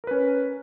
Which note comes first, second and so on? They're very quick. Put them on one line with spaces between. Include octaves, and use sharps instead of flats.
A#4 B4 C#4